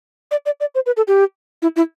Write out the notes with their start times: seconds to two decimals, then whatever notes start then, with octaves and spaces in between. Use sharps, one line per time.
0.31 D5
0.46 D5
0.60 D5
0.75 C5
0.86 B4
0.97 A4
1.08 G4
1.62 E4
1.76 E4